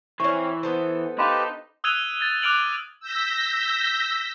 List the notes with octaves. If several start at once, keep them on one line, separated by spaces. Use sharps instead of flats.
E3 C4 C#4 C#6
B3 A4 C5
D#4 G4 B4 F5 A5 B5 C6
D#6 E6 F#6 G#6 D#7 F7
G#6 A6
D6 F6 F#6 D7 F7 F#7
E6 G6 A#6 B6